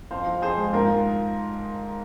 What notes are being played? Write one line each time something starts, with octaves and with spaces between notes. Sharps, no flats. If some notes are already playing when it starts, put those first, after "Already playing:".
F2 C5 F5
F3
F2 G#4 C5
G#3
G#2 F4 A#4